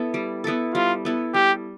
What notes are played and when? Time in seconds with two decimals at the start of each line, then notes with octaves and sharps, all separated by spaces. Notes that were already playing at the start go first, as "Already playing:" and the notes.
Already playing: B3 E4 A4
0.14 G3
0.44 B3 E4 A4
0.75 G3 F4
1.05 B3 E4 A4
1.34 G3 G4